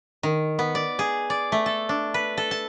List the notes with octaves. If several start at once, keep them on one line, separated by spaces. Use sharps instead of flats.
D#3
B3
D5
G#4
D5
A3
A4
D4
B4
A4
A5